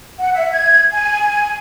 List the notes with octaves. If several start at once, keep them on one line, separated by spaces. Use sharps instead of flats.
F#5
E5
G#6
G#5
G#5